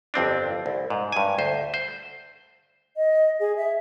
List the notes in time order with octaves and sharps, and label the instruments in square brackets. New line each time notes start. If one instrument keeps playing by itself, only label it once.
[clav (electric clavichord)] G1 F2 C4 D4
C2
G#2
G2 G#5
D2 C5
C5
[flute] D#5
G#4
E5